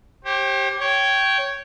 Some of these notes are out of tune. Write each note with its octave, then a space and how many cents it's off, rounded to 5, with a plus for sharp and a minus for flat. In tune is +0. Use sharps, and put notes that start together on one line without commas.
G4 -5 C5 +45
C#5 +0 G5 -15